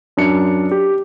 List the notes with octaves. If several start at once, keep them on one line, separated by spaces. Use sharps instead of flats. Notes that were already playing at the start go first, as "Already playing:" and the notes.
F#2 D4 C#7
G4